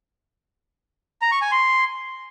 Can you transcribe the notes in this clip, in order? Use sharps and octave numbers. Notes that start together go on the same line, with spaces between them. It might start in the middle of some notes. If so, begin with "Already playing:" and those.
A#5
C#6
G#5
C6